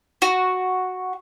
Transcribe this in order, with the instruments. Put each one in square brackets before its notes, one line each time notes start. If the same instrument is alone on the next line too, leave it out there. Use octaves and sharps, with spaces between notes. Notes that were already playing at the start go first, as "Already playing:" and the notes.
[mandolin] F#4